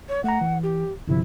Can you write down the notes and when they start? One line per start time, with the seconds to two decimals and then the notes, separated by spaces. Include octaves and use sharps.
0.09 C#5
0.24 A3 F#5 A#5
0.41 E3
0.63 G4
1.08 G1 C3 F3 E4